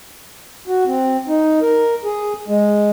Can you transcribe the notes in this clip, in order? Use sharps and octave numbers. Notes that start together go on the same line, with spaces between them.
F#4
C4
D#4
A#4
G#4
G#3